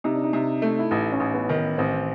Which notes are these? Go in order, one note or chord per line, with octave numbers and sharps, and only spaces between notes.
C3 D#4
D4
D#4
C3
A3
E4
A1 D#4
C#4
A1
B3
D#3
B3
A1 C4